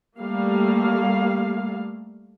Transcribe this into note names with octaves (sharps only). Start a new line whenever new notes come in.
G3 A3 A#3 F5